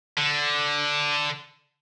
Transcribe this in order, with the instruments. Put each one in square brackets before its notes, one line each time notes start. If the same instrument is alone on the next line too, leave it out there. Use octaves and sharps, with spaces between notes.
[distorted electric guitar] D3